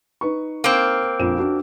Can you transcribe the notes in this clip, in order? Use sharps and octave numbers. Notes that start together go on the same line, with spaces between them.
D#4 B4 C#6
A#3 C4
A#1 F2 E7
D4 F#4